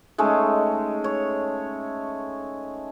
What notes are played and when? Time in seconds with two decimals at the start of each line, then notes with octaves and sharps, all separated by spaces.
0.18 G#3 A3 C#4 D#4
1.04 C#5